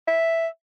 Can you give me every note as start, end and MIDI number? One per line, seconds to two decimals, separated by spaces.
0.07 0.47 76